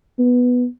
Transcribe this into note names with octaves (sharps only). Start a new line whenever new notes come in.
B3